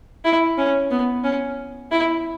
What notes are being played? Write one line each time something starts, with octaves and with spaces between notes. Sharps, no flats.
E4
C#4
B3
C#4
E4